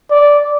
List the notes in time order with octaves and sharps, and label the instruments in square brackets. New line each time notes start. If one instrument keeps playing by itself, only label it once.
[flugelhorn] D5